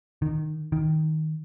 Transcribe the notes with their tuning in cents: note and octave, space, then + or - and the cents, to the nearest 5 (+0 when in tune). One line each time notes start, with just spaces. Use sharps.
D#3 -15
D#3 +10